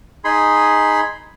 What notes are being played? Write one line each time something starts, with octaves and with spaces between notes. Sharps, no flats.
D#4 G#4 B5 C6